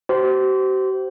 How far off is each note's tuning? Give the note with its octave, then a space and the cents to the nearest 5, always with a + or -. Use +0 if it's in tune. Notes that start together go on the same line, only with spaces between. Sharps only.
G4 -45 C5 -15